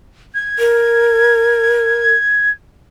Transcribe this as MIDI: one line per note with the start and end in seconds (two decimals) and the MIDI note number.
0.35 2.50 92
0.59 2.13 70